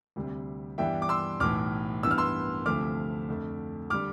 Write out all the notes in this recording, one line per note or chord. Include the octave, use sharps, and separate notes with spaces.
D2 C3 G3
G2 E3 G3 B3 D4 E5 G5
D6
C6 E6
B1 A2 E3 D6 F6
G2 E3 B3 E6
F6
C6 E6
D2 C3 F3 A3 D6 F6
F2 D3 A3
D3 G3 D6 F6